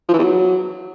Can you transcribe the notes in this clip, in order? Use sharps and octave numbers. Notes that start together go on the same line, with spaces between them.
F3
E3
E2
F#3